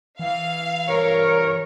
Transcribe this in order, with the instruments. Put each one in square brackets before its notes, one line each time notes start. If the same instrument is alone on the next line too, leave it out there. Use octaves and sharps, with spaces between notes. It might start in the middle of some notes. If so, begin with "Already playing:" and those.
[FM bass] E3 [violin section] F5
[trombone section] C2 A#4 [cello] C#5